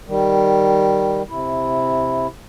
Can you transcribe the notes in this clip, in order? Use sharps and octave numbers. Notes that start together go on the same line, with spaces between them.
D#3 G3
C3 E4